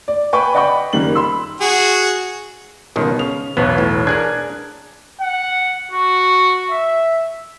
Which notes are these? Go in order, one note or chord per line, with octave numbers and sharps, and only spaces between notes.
D5
B4 G5 G#5 B5 C#6
D5 D#5 F#5 G5 B5 C#6
F#1 D#3 G3 A#3 F#7
B5 C6 E6
F#4 G#4
G1 C#2 B2 D#3
C#3 F7
E1 B1 B3 C#5
A2
D4 G#4 A#4 F#6 G#6
F#5
F#4
E5